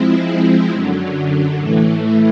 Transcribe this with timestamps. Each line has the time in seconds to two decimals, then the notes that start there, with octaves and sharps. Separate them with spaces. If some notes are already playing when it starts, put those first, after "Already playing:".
Already playing: F3 G#3 C4 E4
0.72 F#2 D3 F#3
1.59 A2 E3 A3